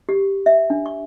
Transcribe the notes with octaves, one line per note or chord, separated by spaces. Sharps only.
G4
E5
D4
C#6